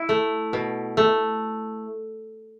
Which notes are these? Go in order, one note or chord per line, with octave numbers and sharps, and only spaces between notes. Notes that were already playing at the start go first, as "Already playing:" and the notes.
Already playing: E4
A3
B2
A3